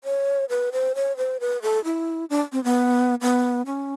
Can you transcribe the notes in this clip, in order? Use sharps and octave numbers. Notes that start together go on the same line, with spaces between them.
C#5
B4
C5
C#5
C5
B4
A4
E4
D4
C4
B3
B3
C#4